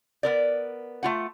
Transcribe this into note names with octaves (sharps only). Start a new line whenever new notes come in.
B3 A#4 D5
A3 F4 F#5